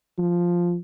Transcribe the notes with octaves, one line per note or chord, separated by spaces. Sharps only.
F3